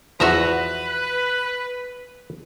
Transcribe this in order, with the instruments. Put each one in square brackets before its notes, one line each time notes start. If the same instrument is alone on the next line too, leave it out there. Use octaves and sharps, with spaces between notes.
[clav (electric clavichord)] E2 F3 [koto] F#4 E5 A#5 [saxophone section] B4